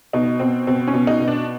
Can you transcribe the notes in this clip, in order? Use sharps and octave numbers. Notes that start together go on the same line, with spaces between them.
B2 D#4
B2 C4
B2 C4
C#4
B2
D#4
B2
D4